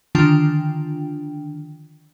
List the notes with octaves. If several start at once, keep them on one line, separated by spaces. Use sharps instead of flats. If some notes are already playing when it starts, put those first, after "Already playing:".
D3 D#3 F3 D4 F4 G5